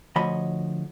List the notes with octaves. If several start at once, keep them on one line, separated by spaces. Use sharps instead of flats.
D2 F3 C#5 D#5 B5